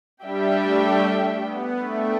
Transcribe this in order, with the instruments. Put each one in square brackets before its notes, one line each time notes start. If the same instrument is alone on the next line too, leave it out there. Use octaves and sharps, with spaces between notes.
[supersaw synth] G3 [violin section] D4 G4 E5 G5
[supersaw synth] A3
B3
[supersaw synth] A3 [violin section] D4 B4 E5 G5